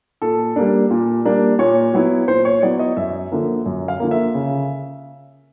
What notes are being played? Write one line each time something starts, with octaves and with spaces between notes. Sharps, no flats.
A#2 A4
G3 A#3 D4
A#2
G3 A#3 D4
A#2 C#5
F#3 B3 E4
A#2 C5
C#5
F#3 B3 E4 D5
D#5
F#2 E5
D3 F3 A#3
F#2
F5
D3 F3 A#3
E5
C#3